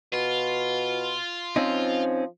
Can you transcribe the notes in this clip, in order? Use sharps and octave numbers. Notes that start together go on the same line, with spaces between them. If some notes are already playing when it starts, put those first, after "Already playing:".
B2 F4
F3 C4 C#4 D#4